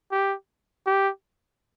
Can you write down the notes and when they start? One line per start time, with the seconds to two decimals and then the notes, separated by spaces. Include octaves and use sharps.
0.12 G4
0.87 G4